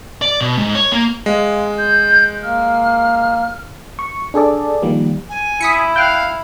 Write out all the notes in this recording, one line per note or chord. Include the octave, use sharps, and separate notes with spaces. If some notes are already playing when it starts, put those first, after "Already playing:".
D5
B2
G#2
C#5
A#3
G#3 F5
G6
A#3 F6
C#6
D4 G#4 A4 D5
D#3 F3 G3 A#3
G#5
E4 D#6 B6 C#7
F5 G5 F#6